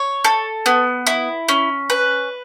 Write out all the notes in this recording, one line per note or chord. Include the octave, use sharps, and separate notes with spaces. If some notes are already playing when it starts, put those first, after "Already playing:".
Already playing: C#5
A4
B3
E4
C#4
B4